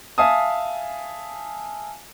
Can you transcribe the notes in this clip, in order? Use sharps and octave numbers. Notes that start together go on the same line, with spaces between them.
E5 F5 G#5 A5 D#6